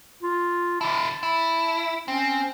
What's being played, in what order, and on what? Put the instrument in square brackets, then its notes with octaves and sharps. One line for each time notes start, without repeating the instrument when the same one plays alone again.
[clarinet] F4
[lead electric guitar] D3 E4 [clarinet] A5
[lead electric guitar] E4
[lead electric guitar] C4 [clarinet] C#4